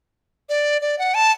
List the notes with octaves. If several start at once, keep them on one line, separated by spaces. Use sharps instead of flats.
D5
D5
F#5
A5